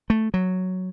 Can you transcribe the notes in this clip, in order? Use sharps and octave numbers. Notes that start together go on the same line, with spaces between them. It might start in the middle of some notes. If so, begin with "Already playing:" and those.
A3
F#3